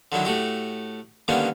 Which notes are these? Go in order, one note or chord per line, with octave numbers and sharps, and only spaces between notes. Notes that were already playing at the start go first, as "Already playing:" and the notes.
D3 D#3 F#3 E4
A2 A3 F#4 G4
D3 D#3 G3 A#3 B3 C#4